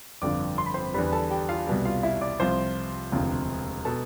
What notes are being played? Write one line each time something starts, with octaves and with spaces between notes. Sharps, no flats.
G1 F2 D3 F3 D5 D6
C6
B5
C5 C6
E2 D3 G3 B4 B5
A4 A5
G4 G5
F4 F5
C2 B2 G3
F4 F5
E4 E5
D5 D6
C2 C3 F3 C5 C6
E1 D2 C3 F3
B2 A4 A5